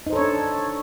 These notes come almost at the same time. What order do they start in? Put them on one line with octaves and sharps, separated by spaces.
D#4 C5 A4 C#5 D4